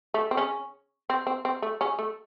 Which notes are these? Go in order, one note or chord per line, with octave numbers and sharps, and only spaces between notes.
A3
C4
C#3 C#4
C4
C4
C4
A3
C#3 C#4
A3